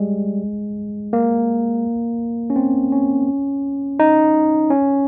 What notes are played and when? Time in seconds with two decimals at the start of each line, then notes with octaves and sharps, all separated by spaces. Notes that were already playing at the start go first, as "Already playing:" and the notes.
Already playing: G3 G#3
1.13 A#3
2.50 C#4
2.56 C4
2.92 C#4
4.00 D#4
4.70 C#4